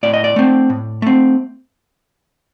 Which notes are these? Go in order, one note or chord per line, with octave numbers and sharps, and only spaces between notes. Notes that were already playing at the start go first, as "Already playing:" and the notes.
A2 D5
D#5
D5
A3 C4
A2
A3 C4